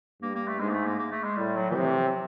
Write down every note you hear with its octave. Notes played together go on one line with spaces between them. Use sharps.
G2 A#3
A#3
A3
G#2 G#3
A#3
A3
A#3
A#3
A3
G#3
A2 G3
F#3
E3
C3 F3
E3
F#3